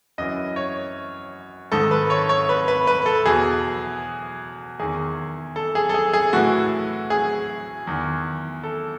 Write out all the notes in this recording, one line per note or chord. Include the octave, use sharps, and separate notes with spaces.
F#2 E3 D#5
C#5
G#2 D#3 A4
B4
C#5
C#5
B4
B4
B4
A4
E2 B2 G#4
E2 D#3 G#4
A4
G#4
A4
G#4
G#4
A2 E3 F#4
G#4
E2 D#3
A4